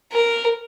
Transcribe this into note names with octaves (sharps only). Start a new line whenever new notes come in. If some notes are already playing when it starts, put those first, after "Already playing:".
A#4